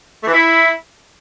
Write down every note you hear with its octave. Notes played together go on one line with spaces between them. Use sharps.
A3
E3
E4